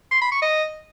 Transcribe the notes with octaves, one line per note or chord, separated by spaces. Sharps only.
C6
B5
C#6
D#5